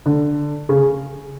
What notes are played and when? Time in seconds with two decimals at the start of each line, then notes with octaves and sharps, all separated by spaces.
0.06 D3
0.69 C#3